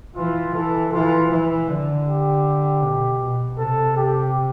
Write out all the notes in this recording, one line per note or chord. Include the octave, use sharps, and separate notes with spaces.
E3 F4
E3 A4
E3 F4
E3
D3
G4
B2
B2
C3 A4
G4